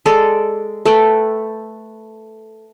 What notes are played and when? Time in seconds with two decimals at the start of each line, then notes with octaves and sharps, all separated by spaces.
0.06 G#3 A4 D5
0.85 A3 A4 B4 G5